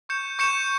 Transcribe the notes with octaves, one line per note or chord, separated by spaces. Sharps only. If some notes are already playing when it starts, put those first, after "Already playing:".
C#6 G6 C#7 E7
C#6 G6 C#7 E7